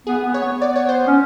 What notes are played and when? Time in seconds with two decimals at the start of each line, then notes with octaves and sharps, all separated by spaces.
0.07 B3 G#4
0.25 B3
0.34 C#5
0.43 B3
0.62 D5
0.76 C#5
0.89 C5
1.07 C#4